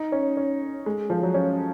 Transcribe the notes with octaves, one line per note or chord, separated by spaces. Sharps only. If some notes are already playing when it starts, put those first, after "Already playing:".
Already playing: D#4
C#4
C#4
G#3
F3
F#3
C#4